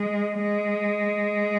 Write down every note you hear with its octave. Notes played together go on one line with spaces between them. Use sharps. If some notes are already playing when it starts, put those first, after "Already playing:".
Already playing: G#3
G#3